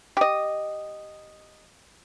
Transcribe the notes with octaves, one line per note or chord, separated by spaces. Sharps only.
G4 D#5